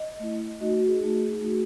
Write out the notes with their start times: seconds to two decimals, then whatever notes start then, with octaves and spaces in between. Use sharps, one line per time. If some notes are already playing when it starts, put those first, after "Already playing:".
Already playing: D#5
0.19 A3 E4
0.61 A3 D#4 F#4 D#5
0.74 F#4
0.87 G#4
1.01 A3 D#4 F#4
1.41 A3 D#4 F#4